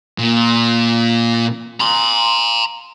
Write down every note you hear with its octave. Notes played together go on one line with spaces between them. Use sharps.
A#2
A#5 C6